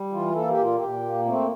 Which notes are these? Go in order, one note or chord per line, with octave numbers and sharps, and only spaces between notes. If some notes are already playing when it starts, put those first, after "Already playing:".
Already playing: G3
E3 F4
A#3 A4
G4
A#2 F4
A#2 G4
A#3
A3 C4